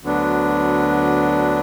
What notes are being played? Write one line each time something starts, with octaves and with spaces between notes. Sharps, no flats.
D2 D3 F#3 B3 D4